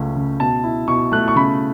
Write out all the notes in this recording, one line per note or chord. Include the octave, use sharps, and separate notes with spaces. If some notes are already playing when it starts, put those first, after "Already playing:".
Already playing: C#2 A3 C#4
C#3
B2 A5
E4
B2 C#6
A3 F#6
C#6
C#3 B5